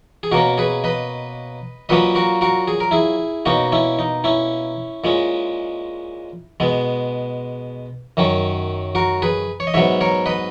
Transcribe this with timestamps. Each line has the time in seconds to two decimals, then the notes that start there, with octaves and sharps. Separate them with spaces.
0.23 G#4
0.32 B2 A#3 C#4 F#4 A#4
0.58 G#4 B4
0.84 B4 D#5
1.89 A#2 F#3 A#3 C#4 B4 D#5
2.15 F#4 A#4
2.41 F#4 A#4
2.68 G#4
2.80 A#4
2.91 E4 G#4
3.46 B2 A#3 C#4 D#4 F#4
3.72 C#4 E4
3.99 D#4
4.24 C#4 E4
5.04 A#2 G#3 C#4
6.60 B2 G#3 B3
8.17 F#2 D#3 F#3 C#4
8.95 F#4 A#4
9.22 G#4 B4
9.60 C#5
9.67 D#5
9.74 G#2 F#3 B3 C#5 E5
10.01 A#4 C#5
10.26 B4 D#5